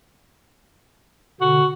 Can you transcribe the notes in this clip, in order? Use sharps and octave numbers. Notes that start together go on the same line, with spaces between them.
B2 D3 F#4